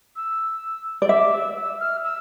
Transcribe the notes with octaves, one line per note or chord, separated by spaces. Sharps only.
E6
D5
E5 D6
E6
E6
F6
E6